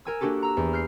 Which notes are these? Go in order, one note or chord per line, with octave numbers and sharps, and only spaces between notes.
A#4 G#5 E6
A#3 D4 F#4 G4 A4
A#5 E6
E2
F6 G6 C7